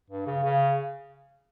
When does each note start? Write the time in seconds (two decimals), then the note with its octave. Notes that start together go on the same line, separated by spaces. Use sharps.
0.10 G2
0.27 C#3
0.44 C#3